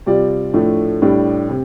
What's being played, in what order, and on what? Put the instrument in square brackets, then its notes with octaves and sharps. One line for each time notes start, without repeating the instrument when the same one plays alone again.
[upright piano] C3 G3 F4 D5
A2 F3 A3 D4
A2 G3 D4 G4
C3